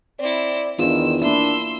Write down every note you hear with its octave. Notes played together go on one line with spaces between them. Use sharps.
C4 E4 D5
E2 D#3 D4 E4 F4 E6
A#3 D4 E4 C6 E6